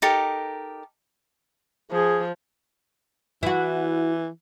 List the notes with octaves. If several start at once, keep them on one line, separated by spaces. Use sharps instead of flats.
D#4 G4 A4 A#4
F3 G#4
E3 E4 F#4